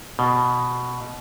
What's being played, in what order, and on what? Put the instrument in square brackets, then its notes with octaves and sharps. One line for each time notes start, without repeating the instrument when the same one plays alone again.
[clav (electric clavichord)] B2